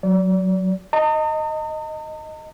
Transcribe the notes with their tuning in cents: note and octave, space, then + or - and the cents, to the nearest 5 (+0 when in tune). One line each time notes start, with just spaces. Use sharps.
F#3 +0 D5 -35
D#5 +0 A#5 -45